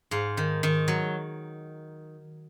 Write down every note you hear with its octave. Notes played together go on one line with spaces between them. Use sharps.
G#2 F5
D#3
D#3
F#3